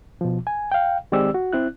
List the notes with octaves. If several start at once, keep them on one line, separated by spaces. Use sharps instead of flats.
B2 F3
G#5
F5 G5
D#3 G#3 C4 G4 D5 E6
F#4
C4 E4 F#6